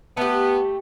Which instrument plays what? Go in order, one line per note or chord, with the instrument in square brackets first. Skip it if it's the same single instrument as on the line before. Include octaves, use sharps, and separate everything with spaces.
[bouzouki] A3 G4 [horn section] B3